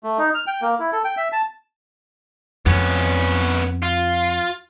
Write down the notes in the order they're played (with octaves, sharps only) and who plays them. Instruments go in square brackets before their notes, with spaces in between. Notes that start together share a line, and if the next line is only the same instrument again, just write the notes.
[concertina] A3
D#4
F6
G5
A#3
E4
A4
G5
E5
A5
[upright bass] F2 [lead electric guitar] B3 C#4
[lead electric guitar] F4